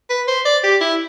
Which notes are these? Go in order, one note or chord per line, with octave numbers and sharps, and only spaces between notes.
B4
C5
D5
G4
E4